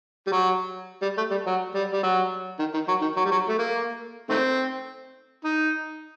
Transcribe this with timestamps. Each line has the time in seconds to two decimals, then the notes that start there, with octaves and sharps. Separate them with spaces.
0.27 G3
0.32 F#3
1.02 G3
1.17 A3
1.31 G3
1.46 F#3
1.74 G3
1.93 G3
2.03 F#3
2.59 D#3
2.74 D#3
2.88 F#3
3.01 D#3
3.17 F#3
3.25 G3
3.31 F#3
3.49 A3
3.59 A#3
4.30 D#3 A3 C4
5.45 D#4